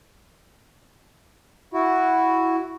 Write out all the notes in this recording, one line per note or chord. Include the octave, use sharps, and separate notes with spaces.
E4 F#4